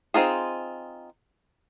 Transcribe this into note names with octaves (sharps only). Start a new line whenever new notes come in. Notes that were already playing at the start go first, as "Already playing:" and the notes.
C4 D#4 F4 G#4